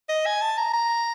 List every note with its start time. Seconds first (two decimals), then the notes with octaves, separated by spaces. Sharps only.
0.09 D#5
0.26 G#5
0.42 A5
0.58 A#5
0.74 A#5